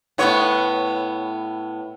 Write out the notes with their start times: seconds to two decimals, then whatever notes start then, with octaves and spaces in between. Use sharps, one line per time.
0.18 A2 B3 C#5